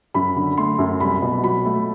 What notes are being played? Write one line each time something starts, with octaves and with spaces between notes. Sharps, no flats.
F#2 B5
D3
A3 C6
F#2
C2 B5
B2
F#3 B5
A3